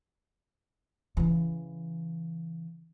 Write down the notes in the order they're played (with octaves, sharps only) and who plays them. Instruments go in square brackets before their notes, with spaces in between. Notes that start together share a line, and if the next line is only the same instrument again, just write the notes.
[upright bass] C#3 E3